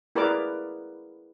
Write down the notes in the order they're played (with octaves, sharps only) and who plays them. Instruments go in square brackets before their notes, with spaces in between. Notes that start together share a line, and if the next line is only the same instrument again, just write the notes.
[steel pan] E4 G#4 A#4 B4 D5 D6